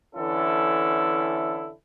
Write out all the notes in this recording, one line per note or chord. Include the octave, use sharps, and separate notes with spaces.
D3 E3 C#4 E4 A4